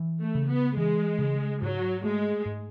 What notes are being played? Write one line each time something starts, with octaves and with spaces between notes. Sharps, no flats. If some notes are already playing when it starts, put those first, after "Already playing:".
Already playing: E3
A3
C#3
B3
E3 G#3
C#3
G#2 F#3
G#3 A3
G#2